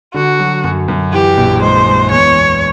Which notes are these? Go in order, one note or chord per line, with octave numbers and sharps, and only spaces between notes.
D3 F#4
F#3
F#2
F#2
E3 G4
A#1
G#3 C5
G#3
E2 C#5
E2